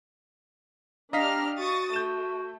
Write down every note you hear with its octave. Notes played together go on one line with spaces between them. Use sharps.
D4 G4 D#5 F5 A#5 F6 B6
F#4 C#6 D#6 A6
A3 G6 E7